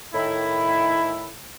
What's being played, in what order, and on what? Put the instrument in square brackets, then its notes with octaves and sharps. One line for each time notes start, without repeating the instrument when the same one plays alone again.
[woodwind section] A2 D#3 E4